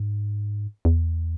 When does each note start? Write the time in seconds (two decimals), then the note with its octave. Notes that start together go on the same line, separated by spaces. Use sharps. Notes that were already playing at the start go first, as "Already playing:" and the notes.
Already playing: G#2
0.85 E2